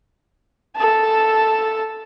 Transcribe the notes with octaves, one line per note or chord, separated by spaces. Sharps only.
A4 A5